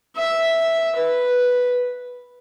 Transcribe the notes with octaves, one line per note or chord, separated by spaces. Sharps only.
E5
B4